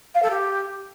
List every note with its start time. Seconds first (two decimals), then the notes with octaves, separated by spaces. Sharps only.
0.15 F5
0.23 A4
0.30 G4